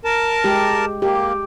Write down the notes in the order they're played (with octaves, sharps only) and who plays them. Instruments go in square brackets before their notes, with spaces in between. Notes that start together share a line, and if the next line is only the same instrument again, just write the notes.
[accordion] A#4 A5
[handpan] G#3 G4
[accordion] A#3 [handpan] G4